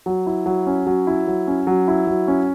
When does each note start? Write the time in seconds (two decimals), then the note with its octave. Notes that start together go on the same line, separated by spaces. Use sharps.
0.06 F#3
0.27 E4
0.46 F#3
0.67 C#4
0.87 F#3
1.07 E4
1.27 F#3
1.47 C#4
1.67 F#3
1.88 E4
2.07 F#3
2.28 C#4